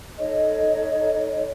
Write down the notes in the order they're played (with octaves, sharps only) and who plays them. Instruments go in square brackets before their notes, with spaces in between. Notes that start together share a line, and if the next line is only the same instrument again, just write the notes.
[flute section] D#4 A4 C#5 D#5